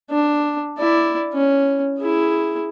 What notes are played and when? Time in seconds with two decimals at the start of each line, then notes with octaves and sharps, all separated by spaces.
0.10 D4
0.78 E4 D5
1.33 C#4
1.99 E4 G#4